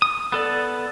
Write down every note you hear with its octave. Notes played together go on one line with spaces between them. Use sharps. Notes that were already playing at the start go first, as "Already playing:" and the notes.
D#6
B3 A4 D5